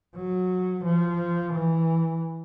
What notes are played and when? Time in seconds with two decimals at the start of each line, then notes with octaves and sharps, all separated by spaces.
0.16 F#3
0.84 F3
1.54 E3